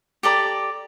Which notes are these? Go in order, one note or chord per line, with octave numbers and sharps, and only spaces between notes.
G4 A4 D5 A#5